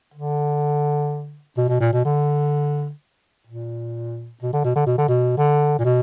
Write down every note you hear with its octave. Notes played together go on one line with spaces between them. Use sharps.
D3
B2
B2
A#2
B2
D3
A#2
B2
D3
B2
D3
B2
D3
B2
D3
A#2
B2